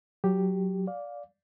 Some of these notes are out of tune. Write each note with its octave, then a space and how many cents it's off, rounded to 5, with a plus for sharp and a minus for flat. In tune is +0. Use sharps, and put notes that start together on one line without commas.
F#3 +0 G4 +0
D5 -15 F5 +15